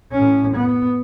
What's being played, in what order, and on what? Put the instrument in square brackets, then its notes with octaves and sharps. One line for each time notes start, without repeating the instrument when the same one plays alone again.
[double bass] A2 C#4
B3